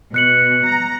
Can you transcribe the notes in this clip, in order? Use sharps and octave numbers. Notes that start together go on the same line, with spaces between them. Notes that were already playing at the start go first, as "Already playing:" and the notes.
B2 F#6 C#7 F#7
A#5